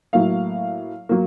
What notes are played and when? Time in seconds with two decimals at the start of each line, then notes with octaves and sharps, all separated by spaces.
0.13 A2 F#3 A#3 F5
1.09 F#3 A#3